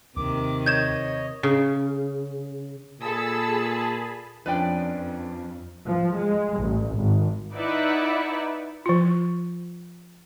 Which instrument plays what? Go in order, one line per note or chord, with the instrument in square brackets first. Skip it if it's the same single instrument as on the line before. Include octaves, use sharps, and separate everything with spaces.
[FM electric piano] D#2 [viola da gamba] C3 D#3 [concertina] D6
[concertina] C#5 D#5 [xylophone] G6 G#6 E7
[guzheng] C#3
[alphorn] A#2 [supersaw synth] G#4 A5 B5 [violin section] A4 E6
[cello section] F2 [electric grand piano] F3 C#4 D4 [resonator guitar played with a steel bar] B4 D5 G5
[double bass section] F3
G#3
A1
G#1
[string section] D#4 E4 B4 D5 E5 F#5
[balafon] F3 F4